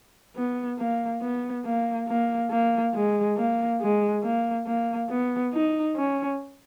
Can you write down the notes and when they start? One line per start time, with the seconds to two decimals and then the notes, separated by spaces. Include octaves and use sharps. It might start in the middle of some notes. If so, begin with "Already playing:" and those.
0.36 B3
0.79 A#3
1.21 B3
1.65 A#3
2.08 A#3
2.51 A#3
2.94 G#3
3.37 A#3
3.81 G#3
4.23 A#3
4.66 A#3
5.09 B3
5.53 D#4
5.96 C#4